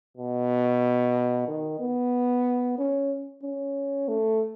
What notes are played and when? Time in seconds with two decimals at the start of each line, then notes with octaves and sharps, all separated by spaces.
0.17 B2
1.48 D#3
1.80 B3
2.78 C#4
3.43 C#4
4.08 A3